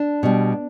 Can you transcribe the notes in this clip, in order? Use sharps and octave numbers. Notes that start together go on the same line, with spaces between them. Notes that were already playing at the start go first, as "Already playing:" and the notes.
Already playing: D4
B2 G3